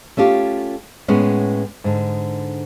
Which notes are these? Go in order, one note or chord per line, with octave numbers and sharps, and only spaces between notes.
A3 C#4 F4 G4
A2 G#3 B3 C#4
G#2 D3